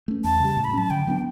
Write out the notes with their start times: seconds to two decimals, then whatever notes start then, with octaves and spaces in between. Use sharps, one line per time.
0.08 A3 C#4
0.24 E2 A5
0.40 C#3 G3
0.57 A2
0.64 B5
0.73 F#3 C#4 A5
0.90 D3 G5
1.07 F#3 B3 D4